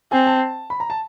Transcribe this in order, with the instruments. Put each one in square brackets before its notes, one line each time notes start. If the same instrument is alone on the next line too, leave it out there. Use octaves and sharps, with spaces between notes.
[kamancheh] C4 [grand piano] G#5
[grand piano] A5
B5
A#5
A5